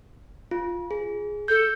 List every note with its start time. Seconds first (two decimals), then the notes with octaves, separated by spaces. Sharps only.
0.51 F4
0.91 G#4
1.48 A4 G6